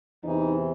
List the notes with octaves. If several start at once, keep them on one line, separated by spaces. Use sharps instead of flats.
E2 C3 E3 D#4